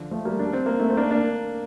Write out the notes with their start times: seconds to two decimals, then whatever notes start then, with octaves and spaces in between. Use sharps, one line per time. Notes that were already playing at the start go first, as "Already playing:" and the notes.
Already playing: D3 F3
0.11 F3 A3
0.25 G3 A#3
0.39 D4
0.53 C4
0.66 A#3
0.79 A3 C4
0.90 C4
0.97 A#3 D4
1.11 A#3 D4